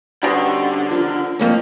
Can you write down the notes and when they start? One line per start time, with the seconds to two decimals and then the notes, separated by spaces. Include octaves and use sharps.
0.23 B2 D3 D#3 G3 C#4 C5
0.91 F3 A#4
1.39 F2 A#3 C#4